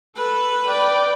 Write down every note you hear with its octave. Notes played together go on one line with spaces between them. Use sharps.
A4 B4
D5 G5